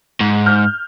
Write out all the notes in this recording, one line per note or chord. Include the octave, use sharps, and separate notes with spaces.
G#2
F6 G6